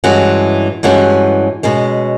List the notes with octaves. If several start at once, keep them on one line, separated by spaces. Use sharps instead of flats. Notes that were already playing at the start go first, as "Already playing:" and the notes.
G2 E3 G#3 C#4 F#4
G2 E3 G#3 C#4 F#4
B2 G#3 C#4